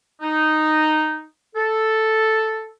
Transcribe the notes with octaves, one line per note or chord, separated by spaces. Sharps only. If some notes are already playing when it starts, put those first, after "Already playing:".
D#4
A4